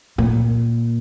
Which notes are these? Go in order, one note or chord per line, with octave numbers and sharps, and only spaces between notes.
A#2